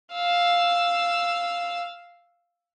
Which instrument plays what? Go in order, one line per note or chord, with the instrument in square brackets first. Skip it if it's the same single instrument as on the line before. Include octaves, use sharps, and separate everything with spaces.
[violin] F5 E6